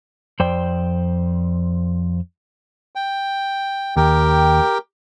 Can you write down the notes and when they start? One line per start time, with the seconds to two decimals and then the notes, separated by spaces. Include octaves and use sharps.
0.40 F2 C5 D5 G5
2.95 G5
3.97 D#2 G4 A#4 G5